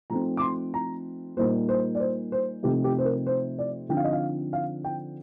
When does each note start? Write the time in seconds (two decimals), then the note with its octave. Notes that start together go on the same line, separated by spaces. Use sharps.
0.10 F3 A3 C4 D#4 A#5
0.37 D6
0.42 C6
0.74 A#5
1.37 A#2 G3 A#3 D#4 C5
1.69 C5
1.95 D5
2.00 C5
2.32 C5
2.63 C3 F3 A3 C4 D#4 G4
2.84 G4
2.98 C5
3.05 A#4
3.26 C5
3.59 D5
3.89 D3 F3 C4 D#4 G5
3.97 F5
4.04 D#5
4.12 F5
4.53 F5
4.84 G5